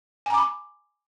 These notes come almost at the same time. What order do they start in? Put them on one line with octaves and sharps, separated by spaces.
G#5 A#5 D6 B5